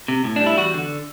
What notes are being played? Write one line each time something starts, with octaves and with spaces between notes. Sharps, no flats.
C3
A2
G3 D4
E4
E2 F#4
D3